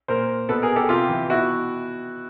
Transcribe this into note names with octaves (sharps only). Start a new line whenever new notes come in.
A#2 A#4 C5
B2 A4 B4
G#4 A#4
G4 A4
C3 F4 G4
E3
B2 E4 F#4